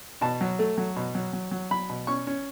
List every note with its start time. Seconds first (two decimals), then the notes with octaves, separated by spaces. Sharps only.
0.21 B2 A5
0.41 F#3
0.59 A3
0.78 F#3
0.96 B2
1.15 F#3
1.33 F#3
1.51 F#3
1.71 F#3 B5
1.90 B2
2.07 C#4 C#6
2.27 C#4